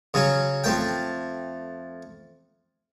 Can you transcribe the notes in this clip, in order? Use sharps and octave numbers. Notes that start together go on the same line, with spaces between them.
C#3 F#3 C#4
F2 A3 G5